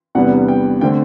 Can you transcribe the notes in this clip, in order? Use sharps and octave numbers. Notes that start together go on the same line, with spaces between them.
E2 C3 G3 B3 D4 F#5
G5
D3 A3 C4 G5